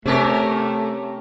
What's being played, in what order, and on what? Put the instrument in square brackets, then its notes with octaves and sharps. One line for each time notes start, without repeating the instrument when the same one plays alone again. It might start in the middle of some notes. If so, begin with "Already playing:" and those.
[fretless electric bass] C3 [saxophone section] A3 [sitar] C#4 G4 A#4